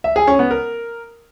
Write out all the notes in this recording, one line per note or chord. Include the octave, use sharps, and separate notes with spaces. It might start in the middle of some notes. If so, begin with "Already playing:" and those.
E5
G#4
C#4
B3
A#4